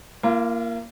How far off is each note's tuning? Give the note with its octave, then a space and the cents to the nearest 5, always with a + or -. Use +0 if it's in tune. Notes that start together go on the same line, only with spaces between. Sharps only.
A#3 +0 F4 -45